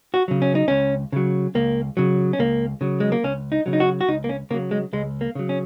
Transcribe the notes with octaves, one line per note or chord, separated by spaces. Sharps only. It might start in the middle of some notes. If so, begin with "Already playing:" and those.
F#4
C#3 F#3
C#4
D#4
C#2 C#4
C#3 F#3
C#2 A#3
C#3 F#3
C#4
C#2 A#3
C#3 F#3
G#3
A#3
C#2 C#4
D#4
C#3 F#3
D#4
F#4
F#4
C#2 D#4
A#3
C#4
C#3 F#3 A#3
G#3
C#2 G#3
A#3
C#3 F#3
C#4